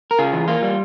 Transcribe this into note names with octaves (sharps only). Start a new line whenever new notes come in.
A#4
C#3 F4 G#4
E3
A#3 F4
G3